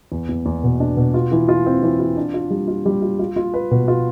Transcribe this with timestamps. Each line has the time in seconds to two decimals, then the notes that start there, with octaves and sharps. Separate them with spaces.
0.12 E2
0.29 E2
0.46 E2
0.64 B2
0.80 D4
0.97 B2
1.14 F4
1.32 E3
1.49 F4
1.66 C4
1.83 E3
2.00 F4
2.17 D4
2.34 F4
2.50 G3
2.68 F4
2.86 G3
3.02 F4
3.19 F4
3.36 F4
3.54 B4
3.71 B2
3.88 F4